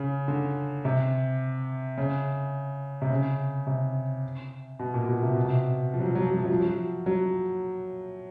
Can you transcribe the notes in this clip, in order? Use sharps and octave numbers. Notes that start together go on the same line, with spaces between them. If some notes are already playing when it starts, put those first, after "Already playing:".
Already playing: C#3
D3
C3
C#3
C3
C#3
C3
B2
A#2
B2
C3
B2
C3
F3
F#3
F3
F#3
F3
F#3
F3
F#3
F3
F#3
F3
F#3